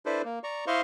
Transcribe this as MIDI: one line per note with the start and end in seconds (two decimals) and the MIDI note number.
0.06 0.22 62
0.06 0.22 64
0.06 0.22 69
0.06 0.22 71
0.06 0.22 72
0.06 0.22 74
0.25 0.39 58
0.44 0.65 74
0.44 0.65 82
0.44 0.65 85
0.67 0.81 64
0.67 0.81 72
0.67 0.81 75
0.67 0.81 77
0.67 0.81 84
0.67 0.81 85